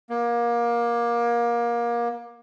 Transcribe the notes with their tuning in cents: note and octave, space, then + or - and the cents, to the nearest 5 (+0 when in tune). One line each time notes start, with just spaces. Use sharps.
A#3 +25